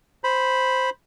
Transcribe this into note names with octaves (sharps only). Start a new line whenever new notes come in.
C5 B5